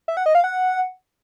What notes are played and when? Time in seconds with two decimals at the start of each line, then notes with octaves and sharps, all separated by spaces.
0.08 E5
0.17 F#5
0.26 D#5
0.35 F5
0.44 F#5